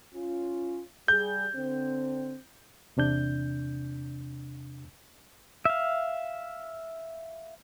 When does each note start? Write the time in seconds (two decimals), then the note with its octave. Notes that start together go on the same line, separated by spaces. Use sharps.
0.14 C#4 F4
1.08 G3 G#4 G6
1.56 D3 C4
2.97 E2 C3 D4 G6
5.65 E5 F5